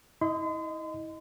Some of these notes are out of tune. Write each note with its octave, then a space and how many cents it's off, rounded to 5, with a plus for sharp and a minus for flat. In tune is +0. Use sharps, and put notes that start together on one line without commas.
E4 -35 D#5 +0 C6 -40